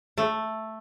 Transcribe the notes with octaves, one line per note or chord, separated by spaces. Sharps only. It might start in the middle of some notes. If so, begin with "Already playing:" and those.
A3